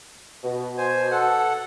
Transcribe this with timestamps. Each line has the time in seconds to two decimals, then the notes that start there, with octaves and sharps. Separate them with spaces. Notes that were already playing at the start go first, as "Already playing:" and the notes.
0.44 B2
0.78 C5 G#5
1.11 A4 F#5